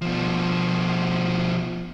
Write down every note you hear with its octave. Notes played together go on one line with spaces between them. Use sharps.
B2 F3